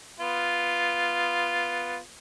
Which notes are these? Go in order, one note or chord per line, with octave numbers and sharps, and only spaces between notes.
B3 F4